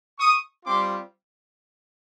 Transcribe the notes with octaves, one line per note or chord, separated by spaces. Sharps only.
C#6 D#6
G3 C4 F4 C6 D6